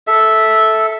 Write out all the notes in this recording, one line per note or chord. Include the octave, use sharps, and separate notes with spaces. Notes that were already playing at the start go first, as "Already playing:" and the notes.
A4 E5